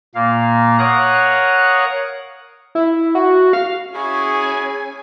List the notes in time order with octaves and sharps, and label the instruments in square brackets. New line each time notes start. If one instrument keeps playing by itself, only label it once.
[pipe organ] A#2 A#3 F5
A#4 C#5 F5 F#5 D#6 F#6
[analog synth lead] E4
F#4
F5
[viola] C#4 G#5 [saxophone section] E4 F#4 [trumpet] G#4